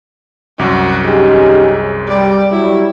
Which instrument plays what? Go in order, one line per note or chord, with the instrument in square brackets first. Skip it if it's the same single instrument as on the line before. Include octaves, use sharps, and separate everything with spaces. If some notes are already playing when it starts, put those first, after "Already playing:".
[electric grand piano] C2 F#2 D6 [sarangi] F#4
[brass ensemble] C#4 D#4 G4 [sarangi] G#4
[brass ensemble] G3 [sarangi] D5
[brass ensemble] F#3 G3 [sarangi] E4